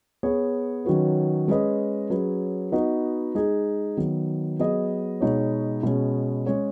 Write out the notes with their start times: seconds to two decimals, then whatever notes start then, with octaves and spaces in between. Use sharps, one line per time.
0.23 B3 G#4 C#5
0.85 D#3 F#3 C#4 F#4 B4
1.48 G#3 C#4 B4 D#5
2.10 F#3 C#4 G#4 B4
2.72 B3 D#4 F#4 B4 D#5
3.35 G#3 D#4 G#4
3.97 D#3 F#3 B3
4.59 F#3 B3 G#4 D#5
5.21 B2 G#3 D#4 F#4 C#5
5.83 B2 G#3 C#4
6.46 G#3 C#4 G#4 C#5